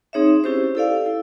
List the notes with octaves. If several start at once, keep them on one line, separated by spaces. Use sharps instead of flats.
C4 D#4 G#4 C#5 E5
C#4 E4 G4 C5
E4 A4 D5 F5
E4